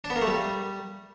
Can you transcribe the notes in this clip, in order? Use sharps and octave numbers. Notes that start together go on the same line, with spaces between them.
D4
B3
A#3
A3
G3